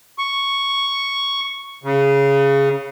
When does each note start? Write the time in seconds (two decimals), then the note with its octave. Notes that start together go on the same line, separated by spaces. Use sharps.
0.18 C#6
1.84 C#3